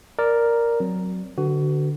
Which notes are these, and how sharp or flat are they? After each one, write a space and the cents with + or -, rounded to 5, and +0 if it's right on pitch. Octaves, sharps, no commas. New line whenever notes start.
A#4 +0 D5 +0
F#3 +0 C4 +0
D3 +0 F#4 +20 B4 +25